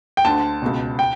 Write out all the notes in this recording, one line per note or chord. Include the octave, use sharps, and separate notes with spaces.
G5
D2 D3 A5
C#2 B2
G5